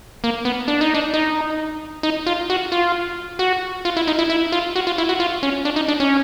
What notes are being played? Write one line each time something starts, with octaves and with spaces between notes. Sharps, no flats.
A#3
B3
D4
D#4
D4
D#4
D#4
F4
F#4
F4
F#4
F4
E4
D#4
E4
E4
F4
F#4
F4
E4
F#4
F4
C#4
D4
D#4
D4
C#4